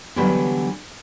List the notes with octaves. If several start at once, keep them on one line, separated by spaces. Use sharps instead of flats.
D3 E3 F#3 G3 B3 B4